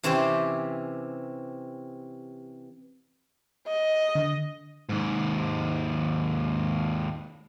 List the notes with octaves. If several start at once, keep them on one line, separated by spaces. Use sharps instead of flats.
C3 E3 C4 C#4 G4 C5
D#5
D3
D#2 G#2